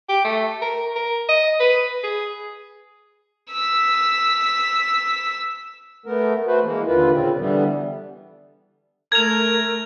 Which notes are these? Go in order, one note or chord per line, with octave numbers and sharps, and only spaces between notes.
G4
A3
A#4
A#4
D#5
B4
G#4
E6 B6
A3 B3 A#4
A3 F#4 B4 C5
E3 G#3 A#3
D#2 D3 F4 B4
A#2 C#3 C4
D3 E3 G3 B3
A3 A#4 G#6 F7